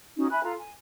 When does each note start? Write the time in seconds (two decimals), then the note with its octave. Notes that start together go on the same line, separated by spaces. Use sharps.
0.17 C#4 D#4 F#4
0.30 E5 G#5 B5 F#6
0.43 F4 A4 A#5
0.58 G#5